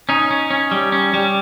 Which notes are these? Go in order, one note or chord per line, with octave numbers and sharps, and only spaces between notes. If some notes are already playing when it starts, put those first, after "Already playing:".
C#4 D#4
C#4
C#4
G3
C#4
G3